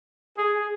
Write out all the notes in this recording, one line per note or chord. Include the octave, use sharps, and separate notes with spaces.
G#4